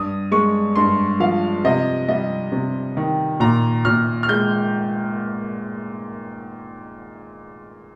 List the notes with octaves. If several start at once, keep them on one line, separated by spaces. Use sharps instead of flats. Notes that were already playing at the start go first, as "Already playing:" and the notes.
Already playing: G2 D#6
G#3 C#6
G2 C6
F3 F5
C3 D#5
G3 D#5
C3
D#3
A#2 A#5
A#2 F6
F6
G#3 G6